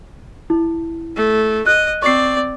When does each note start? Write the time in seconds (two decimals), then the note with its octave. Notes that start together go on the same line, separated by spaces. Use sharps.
0.50 E4
1.16 A3
1.67 D#5 F#6
2.02 C4 D5 C#6 C7